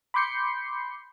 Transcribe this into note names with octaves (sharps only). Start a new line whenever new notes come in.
B5 C6 D6 G6 C7 C#7